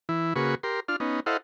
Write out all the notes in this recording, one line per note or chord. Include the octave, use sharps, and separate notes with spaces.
E3 E4
C#3 A#3 F#4 G#4 B4 C#6
G4 A#4 C6
D4 F4 F6
B3 C#4 D#4
E4 A4 C5 D#5 F5 F#5